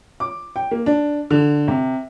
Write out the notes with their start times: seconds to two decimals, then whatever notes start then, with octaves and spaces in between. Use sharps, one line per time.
0.20 D6
0.56 G5
0.71 A#3
0.86 D4
1.31 D3
1.68 C3